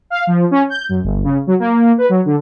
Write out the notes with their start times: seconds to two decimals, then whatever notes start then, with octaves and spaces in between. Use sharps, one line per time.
0.10 F5
0.27 F3
0.51 C#4
0.70 G6
0.89 F#2
1.03 G1
1.24 C#3
1.47 F#3
1.59 A#3
1.98 B4
2.09 F#3
2.25 D3